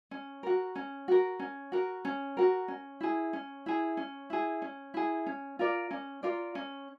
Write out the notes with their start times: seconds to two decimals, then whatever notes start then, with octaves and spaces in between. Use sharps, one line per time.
0.11 C#4
0.43 F#4 A#4
0.75 C#4
1.08 F#4 A#4
1.39 C#4
1.72 F#4 A#4
2.05 C#4
2.37 F#4 A#4
2.68 C#4
3.01 E4 G#4
3.33 C#4
3.66 E4 G#4
3.97 C#4
4.30 E4 G#4
4.62 C#4
4.94 E4 G#4
5.26 C#4
5.59 F4 A#4 D5
5.91 C#4
6.23 F4 A#4 D5
6.55 C#4